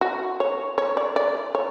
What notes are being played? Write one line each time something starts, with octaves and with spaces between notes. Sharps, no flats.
F#4
C#5
C#5
D5
D5
C#5